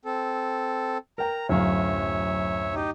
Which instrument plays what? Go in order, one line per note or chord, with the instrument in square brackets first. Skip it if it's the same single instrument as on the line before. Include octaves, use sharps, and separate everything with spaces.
[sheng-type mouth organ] C4 A4
[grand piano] A#4 G5 [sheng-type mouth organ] A#5
[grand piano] D1 F#2 F5 [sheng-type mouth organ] C#5 E5
[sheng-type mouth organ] D#4 G4